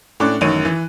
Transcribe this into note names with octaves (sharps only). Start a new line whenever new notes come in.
A2 C#4 D4 D6 F#6
A1 F#2 D#3 C#5 D#7
E3